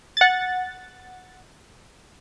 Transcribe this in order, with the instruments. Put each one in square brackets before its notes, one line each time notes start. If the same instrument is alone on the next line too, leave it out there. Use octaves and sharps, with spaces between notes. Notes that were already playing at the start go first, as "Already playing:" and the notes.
[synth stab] F#5 A6